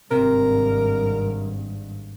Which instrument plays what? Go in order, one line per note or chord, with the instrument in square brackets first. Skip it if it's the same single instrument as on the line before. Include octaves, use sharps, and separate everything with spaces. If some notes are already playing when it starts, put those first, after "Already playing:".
[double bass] G#1 G2 [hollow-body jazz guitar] C3 [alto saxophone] A#4